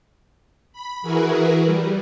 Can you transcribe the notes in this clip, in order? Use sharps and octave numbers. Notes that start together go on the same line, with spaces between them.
B5
E3 E4 F#4 G#4 A#4 B4
G3